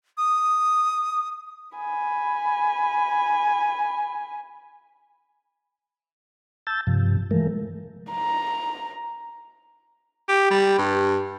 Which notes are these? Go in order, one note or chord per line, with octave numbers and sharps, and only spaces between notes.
D#6
G#5 B5
A5 E6 G6 A6
G2 C3 F3
E3 F3 G#3 A3 A#4
A#5
G4
G3
G2